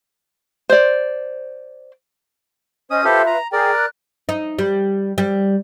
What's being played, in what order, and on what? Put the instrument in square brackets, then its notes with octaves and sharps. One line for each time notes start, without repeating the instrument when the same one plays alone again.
[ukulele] C5 D5
[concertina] C#4 D#6 [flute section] C5 D#5 G#5
[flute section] F4 B4 E5 [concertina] G4 A4 C5
[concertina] A#5
[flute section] G#4 G5 [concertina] A#4 D5
[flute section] F#6
[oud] D#4
G3
G3